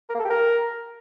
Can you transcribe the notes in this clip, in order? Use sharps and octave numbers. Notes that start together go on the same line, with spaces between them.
A#4
A#3
A4
G4
A#4